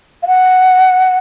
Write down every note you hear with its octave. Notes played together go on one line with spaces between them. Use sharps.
F5
F#5